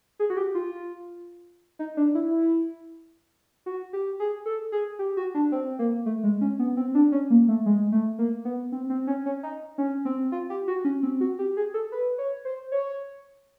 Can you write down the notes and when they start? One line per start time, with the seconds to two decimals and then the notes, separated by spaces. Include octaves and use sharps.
0.20 G#4
0.30 F#4
0.37 G4
0.55 F4
1.79 D#4
1.97 D4
2.15 E4
3.66 F#4
3.93 G4
4.20 G#4
4.46 A4
4.72 G#4
4.99 G4
5.17 F#4
5.35 D4
5.52 C4
5.79 A#3
6.06 A3
6.23 G#3
6.41 C#4
6.59 B3
6.77 C4
6.95 D4
7.12 C#4
7.30 A#3
7.48 A3
7.66 G#3
7.92 A3
8.19 A#3
8.45 B3
8.72 C4
8.90 C4
9.07 C#4
9.26 C#4
9.43 D#4
9.78 C#4
10.05 C4
10.32 F4
10.50 G4
10.68 F#4
10.85 C#4
11.03 C4
11.21 F#4
11.39 G4
11.57 G#4
11.74 A4
11.92 B4
12.18 C#5
12.45 C5
12.72 C#5